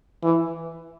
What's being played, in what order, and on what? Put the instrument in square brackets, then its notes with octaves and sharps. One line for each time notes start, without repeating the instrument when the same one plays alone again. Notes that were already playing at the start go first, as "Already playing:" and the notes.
[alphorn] E3